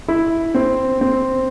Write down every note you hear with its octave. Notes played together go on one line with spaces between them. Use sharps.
E4
C4
C4